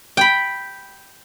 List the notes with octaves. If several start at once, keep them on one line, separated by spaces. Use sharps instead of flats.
G5 B5